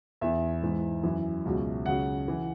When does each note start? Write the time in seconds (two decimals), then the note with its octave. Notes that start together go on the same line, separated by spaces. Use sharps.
0.21 E2 E3 E5
0.62 G#2 E3
1.03 F#2 E3
1.46 C#2 B2 F#3
1.86 C#2 C#3 F#3 F#5
2.28 E3